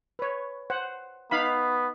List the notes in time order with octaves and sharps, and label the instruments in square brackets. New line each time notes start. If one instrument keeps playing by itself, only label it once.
[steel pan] B4 C#5
C5 F#5
[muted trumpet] B3 [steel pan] D#4 F5 B5